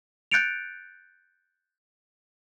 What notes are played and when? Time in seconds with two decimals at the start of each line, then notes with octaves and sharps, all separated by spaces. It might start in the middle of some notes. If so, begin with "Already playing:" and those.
0.31 F#6 G6 A6 C#7 D7 F7